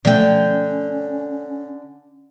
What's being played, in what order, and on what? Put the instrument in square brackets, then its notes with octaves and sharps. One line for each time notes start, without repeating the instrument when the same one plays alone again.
[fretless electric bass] B2 F3 A3 [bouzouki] D3 G5 [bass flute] C#4